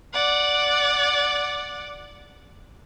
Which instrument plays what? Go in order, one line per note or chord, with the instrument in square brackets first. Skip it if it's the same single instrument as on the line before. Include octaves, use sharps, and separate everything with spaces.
[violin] D5 F#5